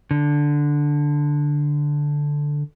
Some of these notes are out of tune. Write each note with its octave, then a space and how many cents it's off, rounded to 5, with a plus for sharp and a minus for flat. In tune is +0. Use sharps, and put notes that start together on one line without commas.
D3 +0